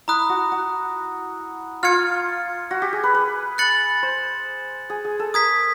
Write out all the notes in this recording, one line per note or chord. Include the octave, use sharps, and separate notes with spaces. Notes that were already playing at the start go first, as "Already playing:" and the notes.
E4 A#5 D#6 F#6
F#4
F#4
F4 F6 G#6 C#7
F#4
G4
G#4
B4
B4
F#6 A6 C#7 F#7
C5
G#4
G#4
A4
A#4 D#6 G#6 B6